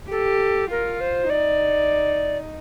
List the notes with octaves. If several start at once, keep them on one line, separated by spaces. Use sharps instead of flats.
G4 A4
F4 A#4
C5
D#4 D5